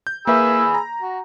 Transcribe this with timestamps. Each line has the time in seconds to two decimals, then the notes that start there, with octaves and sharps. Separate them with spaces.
0.07 G6
0.27 A#3 G#4 B4 E5 B5 E6
0.74 A#5
1.02 F#4